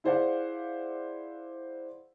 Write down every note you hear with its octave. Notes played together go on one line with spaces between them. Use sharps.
E4 G#4 C5 D5 F5 F#5